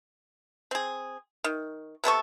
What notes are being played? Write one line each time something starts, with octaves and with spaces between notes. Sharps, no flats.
C4 G#4
D#3
C3 B3 A4 C#6